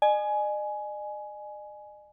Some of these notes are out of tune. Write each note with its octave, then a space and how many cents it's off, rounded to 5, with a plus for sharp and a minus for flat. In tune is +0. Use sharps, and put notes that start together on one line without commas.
D#5 -45 G#5 +15